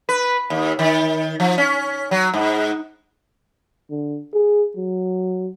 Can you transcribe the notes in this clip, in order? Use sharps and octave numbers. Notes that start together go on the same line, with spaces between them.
B4
D#2
D#3
F3
C#4
F#3
G#2
D3
G#4
F#3